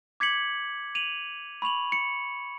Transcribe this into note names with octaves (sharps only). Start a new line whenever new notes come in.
D6 G#6 B6 C#7 F#7
D#7 F7 F#7
B5 C#6 F7 F#7
C#7